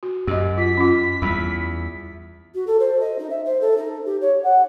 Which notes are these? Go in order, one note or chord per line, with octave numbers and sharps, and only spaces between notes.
F#4
F#2 G4 D#5
F4 B6
C#4 F4
E2 G3 B5
F#4
A4
C5
D#5
D#4
E5
C5
A4
D#4
G4
C#5
F#5